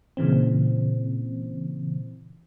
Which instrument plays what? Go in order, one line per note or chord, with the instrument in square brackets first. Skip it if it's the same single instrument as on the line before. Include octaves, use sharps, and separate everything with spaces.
[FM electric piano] A#2 C#3 E3 C4